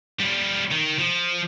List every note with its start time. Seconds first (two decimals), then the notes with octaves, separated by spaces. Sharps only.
0.20 G3 F4
0.71 D#3
0.99 F3